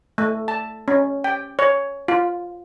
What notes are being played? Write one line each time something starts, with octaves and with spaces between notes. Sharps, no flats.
A3
A5
C#4
G5
C#5
F4